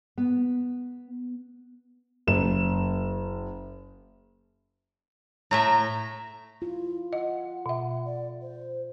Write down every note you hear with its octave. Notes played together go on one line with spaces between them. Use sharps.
B3
F#1 E7
A2 A3 E5 A#5
E4 F4
D#5 F#5
B2 E5
D5
C5